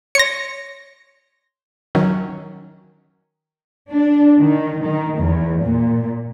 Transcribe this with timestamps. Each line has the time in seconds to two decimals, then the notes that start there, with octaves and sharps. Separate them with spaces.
0.15 C#5 C6 A#6 C#7
1.95 D#3 F#3 C#4
3.90 D4
4.39 D#3
4.84 D#3
5.18 E2
5.65 A#2